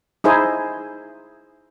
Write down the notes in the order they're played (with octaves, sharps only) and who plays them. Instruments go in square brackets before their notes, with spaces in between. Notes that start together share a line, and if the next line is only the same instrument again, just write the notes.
[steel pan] D#4 E4 G#4 C5